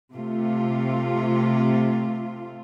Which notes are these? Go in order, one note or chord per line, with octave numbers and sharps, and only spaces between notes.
C3 A3 F4